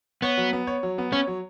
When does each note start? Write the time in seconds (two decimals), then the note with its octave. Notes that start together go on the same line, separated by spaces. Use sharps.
0.22 B3 C#5
0.37 F#3
0.53 B3
0.67 C#5
0.83 F#3
0.98 B3
1.12 C#4 C#5
1.27 F#3